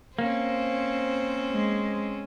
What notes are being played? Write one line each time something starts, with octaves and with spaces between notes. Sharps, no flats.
A#3 C4 C#4 C5
G#3